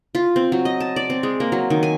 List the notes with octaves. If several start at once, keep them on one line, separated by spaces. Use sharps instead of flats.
F4
C4
F#3
D#5
A5
D5
C4
G#3
A#3
F#3
D#3
G#5